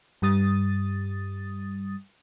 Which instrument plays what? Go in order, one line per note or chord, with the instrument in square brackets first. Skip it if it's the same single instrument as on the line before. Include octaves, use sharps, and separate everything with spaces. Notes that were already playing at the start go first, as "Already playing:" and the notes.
[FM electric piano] G2 G3 D#6 A6